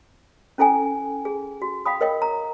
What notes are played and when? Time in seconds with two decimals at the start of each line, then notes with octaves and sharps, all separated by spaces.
0.58 C#4 E4 A4 G5 G#5
1.25 G#4
1.62 F#4
1.86 F5 G5 B5 D#6
2.01 A#4 C#5 D#5 G5
2.22 A#5